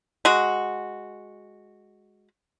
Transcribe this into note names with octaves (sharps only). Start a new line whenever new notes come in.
G#3 F#4